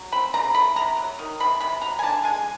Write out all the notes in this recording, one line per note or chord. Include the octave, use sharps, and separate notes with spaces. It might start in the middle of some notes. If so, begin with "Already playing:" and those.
Already playing: F#3
C4 B5
C#3 A#5
A3 B5
C3 A#5
F#3
D#3
C3 B5
C3 B5
F#3 A#5
G#5
D3 A5
G#3 G#5